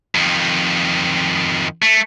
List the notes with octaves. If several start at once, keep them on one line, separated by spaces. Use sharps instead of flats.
F2 D#3
A3